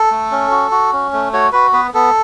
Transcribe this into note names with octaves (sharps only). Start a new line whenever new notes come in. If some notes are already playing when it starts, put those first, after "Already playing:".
Already playing: A4
A3
C#4
F#4
F#4
C#4
A3
F#4 C#5
F#4 B4
B3 B4
B3 A4